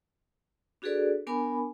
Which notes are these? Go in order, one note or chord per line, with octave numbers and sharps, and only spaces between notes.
D4 F#4 G#4 A4 B4 D5
B3 D4 A#4 G#5 B5 D6